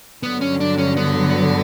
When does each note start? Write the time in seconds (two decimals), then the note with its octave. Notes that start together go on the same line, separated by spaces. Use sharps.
0.23 G2 D3 F#3 B3
0.41 C#4
0.60 D4
0.78 C#4
0.97 B3